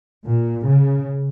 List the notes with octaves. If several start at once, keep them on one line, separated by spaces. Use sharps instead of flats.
A#2
C#3